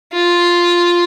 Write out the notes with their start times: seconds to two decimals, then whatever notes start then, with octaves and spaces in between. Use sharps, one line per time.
0.13 F4